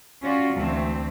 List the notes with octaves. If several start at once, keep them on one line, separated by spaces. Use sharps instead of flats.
C#4 F4 F#4 D5
D2 E3 A3 C4